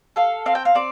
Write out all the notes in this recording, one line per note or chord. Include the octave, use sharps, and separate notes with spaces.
A4 F5
C4 F5
G5
F5
C4 D5